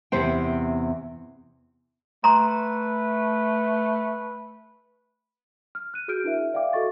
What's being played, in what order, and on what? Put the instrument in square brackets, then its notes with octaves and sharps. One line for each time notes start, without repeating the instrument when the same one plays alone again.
[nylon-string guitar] E2 C3 C5 G5
[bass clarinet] A3 [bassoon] B4 [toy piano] A#5 C6
[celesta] F6
F#6 D#7
F#4 G#4 F6 G6 D7
D4 E4 A#4 E5
D5 E5 F5 G5 D6
F#4 A4 D#5 C#6 A6